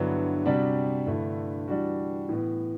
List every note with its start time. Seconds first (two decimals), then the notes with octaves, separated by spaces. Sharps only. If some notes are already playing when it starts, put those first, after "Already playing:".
Already playing: G2 D3 F#3 B3 E4
0.45 C3 G3 D4 F#4
1.07 G2 D3 A3 E4
1.68 E3 G3 D4 F#4
2.29 A2 E3 B3